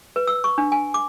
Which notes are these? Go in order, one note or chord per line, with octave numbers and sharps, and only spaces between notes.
B4
E6
C#6
D4
G#5
D6